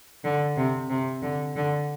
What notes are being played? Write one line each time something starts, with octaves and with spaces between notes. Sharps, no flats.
D3
C3
C3
D3
D3